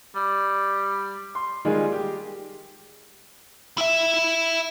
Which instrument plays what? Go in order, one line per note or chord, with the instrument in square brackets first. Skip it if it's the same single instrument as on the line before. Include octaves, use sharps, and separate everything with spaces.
[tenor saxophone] G3
[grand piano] C6
D#3 G3 G#3 A#3 F4 G#4
G4
[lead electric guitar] E4 E5